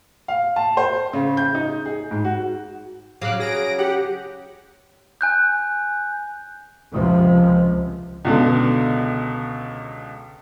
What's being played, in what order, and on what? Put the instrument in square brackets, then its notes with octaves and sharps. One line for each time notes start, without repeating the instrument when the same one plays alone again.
[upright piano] F5
A5
C5
C#3
G6
D#4
G#4
G#2
F#4
[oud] C#3 F#3 [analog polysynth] F5 D6 F#6
[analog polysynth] G#4 A#6 D7
G4 F#5
[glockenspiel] G#5 F#6 G6
[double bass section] C#2 C3 F3
[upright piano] C#2 B2 D3